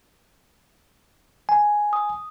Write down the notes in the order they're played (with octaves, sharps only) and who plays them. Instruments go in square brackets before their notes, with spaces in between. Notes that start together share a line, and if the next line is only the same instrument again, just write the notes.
[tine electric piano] G#5
[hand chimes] D#6